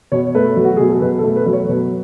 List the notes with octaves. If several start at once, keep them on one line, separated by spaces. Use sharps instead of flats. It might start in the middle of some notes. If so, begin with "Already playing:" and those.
B2 C#5
A3 B4
F#3
F#4
B2 G#4
A4
B2 B4
A4
A3
B4
F#3
C#5
B2 B4